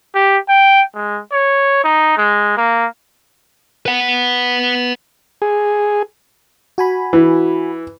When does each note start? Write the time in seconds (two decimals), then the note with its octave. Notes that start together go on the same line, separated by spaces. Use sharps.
0.15 G4
0.49 G5
0.95 G#3
1.32 C#5
1.84 D#4
2.18 G#3
2.57 A#3
3.86 B4 F#5
5.42 G#4
6.78 F#4 G#5 B5
7.13 E3